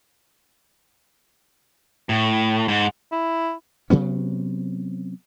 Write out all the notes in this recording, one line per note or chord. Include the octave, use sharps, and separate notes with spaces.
A2
G#2
E4
C3 F#3 B3 C#4